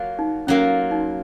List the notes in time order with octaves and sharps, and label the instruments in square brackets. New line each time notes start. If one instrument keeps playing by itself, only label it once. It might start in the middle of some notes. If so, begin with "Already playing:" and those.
Already playing: [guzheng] F#3 A#3 F4
[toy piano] D#4
[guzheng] F#3 A#3 F4 [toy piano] C#4
[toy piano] D#4